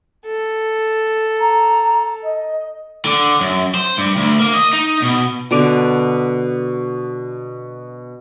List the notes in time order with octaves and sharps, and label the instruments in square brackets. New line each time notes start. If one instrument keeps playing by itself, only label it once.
[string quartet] A4
[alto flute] A#5
D#5
[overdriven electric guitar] D3
F#2
C5
G2
D2
A#3
D#5
D#4
B2
[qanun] B2 D3 D6